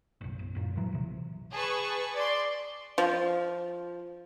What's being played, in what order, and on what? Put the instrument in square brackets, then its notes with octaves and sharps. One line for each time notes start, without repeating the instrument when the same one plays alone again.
[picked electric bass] F#1 B1
F#1
D1 F#2 A#2
E3 F#3
B1 C3
[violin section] G#4 B4 A5 C#6
D5 C6
[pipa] F3